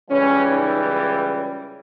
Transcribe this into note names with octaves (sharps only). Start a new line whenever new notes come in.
C#2 C#3 E3 G3 C#4
D#4